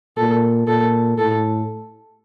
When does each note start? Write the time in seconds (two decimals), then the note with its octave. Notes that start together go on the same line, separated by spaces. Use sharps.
0.17 A#2 A4
0.68 A#2 A4
1.18 A2 A4